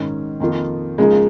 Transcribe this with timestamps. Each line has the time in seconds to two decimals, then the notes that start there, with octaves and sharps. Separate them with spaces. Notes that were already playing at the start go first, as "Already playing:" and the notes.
Already playing: G#2 D#3 C#4
0.40 F2 D#3 A#3 F4
0.98 C#3 F3 G#3 A#3 D#4